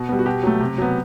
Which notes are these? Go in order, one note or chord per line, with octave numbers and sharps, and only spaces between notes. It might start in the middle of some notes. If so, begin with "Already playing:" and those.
Already playing: B2 F#4
G3 B3
F#4
B2 G4
F#3 A3
C3
F#3 B3